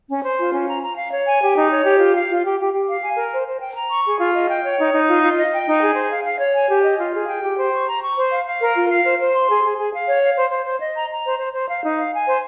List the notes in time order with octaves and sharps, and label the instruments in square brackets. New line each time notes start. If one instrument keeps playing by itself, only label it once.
[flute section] C#4
C5
F4
C#4
A#5
A#5
F5
C#5
G#5
G4
D#4
C#5
G4
F4
F5
F4
G4
G4
G4
F5
G#5
A#4
C5
C5
G5
A#5
C#6
G#4
F4
D#5
G5
C#5
D#4
D#4
F4
F4
D#5
G5
D#4
G#4
C5
F5
F5
C#5
G#5
G4
D#5
F4
G#4
G5
G4
C5
C#6
A#5
C#6
C5
F5
F5
A#4
F4
F5
C5
C5
C6
G#4
G#4
G#4
F5
C#5
F5
C5
C5
C5
D#5
A#5
A#5
C5
C5
C5
F5
D#4
F5
G#5
C5